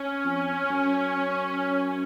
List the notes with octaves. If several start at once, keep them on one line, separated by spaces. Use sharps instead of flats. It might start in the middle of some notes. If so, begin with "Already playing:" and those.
Already playing: C#4
F2
F#2